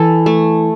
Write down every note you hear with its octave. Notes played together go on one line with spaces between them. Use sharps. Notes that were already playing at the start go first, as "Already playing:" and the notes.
Already playing: E3 A4
A3